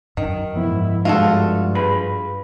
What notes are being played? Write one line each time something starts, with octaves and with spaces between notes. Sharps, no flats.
F#2 D#3
G#2 F3 B3 E4
G2 G#3 F4 F#4 A4 E5
G#4 B4 B5